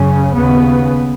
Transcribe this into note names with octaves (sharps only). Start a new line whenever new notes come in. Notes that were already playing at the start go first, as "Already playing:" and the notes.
Already playing: F#2 C#3 C#4
D#2 C#3 B3